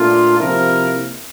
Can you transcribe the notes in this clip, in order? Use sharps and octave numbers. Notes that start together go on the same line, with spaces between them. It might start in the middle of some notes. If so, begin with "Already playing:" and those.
Already playing: A#2 A3 D4 F4
C3 F3 A#3 E4 A#4